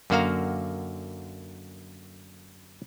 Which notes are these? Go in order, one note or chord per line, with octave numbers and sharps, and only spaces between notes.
F#2 D3 A#3 F#4 F5 A#5